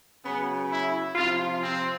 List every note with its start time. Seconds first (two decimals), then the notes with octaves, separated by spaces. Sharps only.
0.23 C#3 F#3 B3
0.69 E4
1.15 C3 F3 F4
1.61 C4